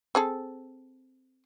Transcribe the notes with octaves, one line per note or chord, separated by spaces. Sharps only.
C4 G#4 A4